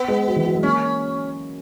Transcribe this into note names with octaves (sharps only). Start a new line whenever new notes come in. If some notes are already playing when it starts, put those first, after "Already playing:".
Already playing: B3
G#3
F#3
E3
F#3
G#3
A#3 C#4